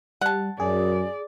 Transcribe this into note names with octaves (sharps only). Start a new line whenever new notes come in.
G3 F#5 A5
F#2 G#4 D5